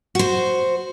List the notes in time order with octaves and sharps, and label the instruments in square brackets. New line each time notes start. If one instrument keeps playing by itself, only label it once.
[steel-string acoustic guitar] F#4 C5